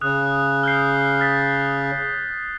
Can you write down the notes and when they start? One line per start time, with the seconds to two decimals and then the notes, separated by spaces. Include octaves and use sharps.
0.01 C#3 D#6 F#6
0.63 F6 G6 C7
1.20 F6 A6 B6